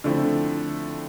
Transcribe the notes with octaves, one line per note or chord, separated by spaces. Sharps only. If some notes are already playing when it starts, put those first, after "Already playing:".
D3 F3 A3 C4 E4